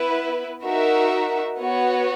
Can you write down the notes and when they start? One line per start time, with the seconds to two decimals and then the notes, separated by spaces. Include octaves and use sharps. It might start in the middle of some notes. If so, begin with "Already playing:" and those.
Already playing: B3 E4 B4
0.63 D#4 F#4 A#4 E5
1.58 B3 F#4 C#5